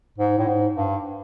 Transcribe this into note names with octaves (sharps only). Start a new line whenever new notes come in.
G#2
A2
G#2
G2